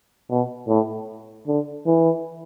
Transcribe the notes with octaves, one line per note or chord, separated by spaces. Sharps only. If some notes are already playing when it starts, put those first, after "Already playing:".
B2
A2
D3
E3